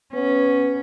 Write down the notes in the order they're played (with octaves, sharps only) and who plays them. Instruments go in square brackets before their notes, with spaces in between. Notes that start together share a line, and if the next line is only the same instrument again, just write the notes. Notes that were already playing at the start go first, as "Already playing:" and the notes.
[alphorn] B3 [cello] C#4